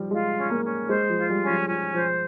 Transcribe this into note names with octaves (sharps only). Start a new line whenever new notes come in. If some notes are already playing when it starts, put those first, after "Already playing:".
Already playing: F3 G3
G#3 F4
C#4
A#3
C#4
G#3 C5
F3
F4
G3
C#4
F3
F3 C#4
F3 C5